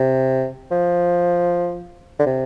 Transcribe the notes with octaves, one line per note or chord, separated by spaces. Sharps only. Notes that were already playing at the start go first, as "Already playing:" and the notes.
Already playing: C3
F3
D3
C3